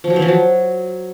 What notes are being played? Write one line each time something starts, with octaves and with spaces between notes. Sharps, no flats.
F3
F#3
E3
F3
F#3